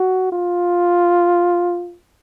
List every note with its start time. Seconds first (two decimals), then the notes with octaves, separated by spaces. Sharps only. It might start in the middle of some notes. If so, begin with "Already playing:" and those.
Already playing: F#4
0.32 F4